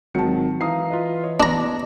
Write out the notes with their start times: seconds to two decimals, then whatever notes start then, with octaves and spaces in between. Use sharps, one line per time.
0.15 G#1 D#3 F#3 A5 C#7
0.61 E3 F5 A#5 D#6 C7
0.90 F4 B4 D#5
1.24 C#5 D#5
1.40 B3 D4 A5 A#5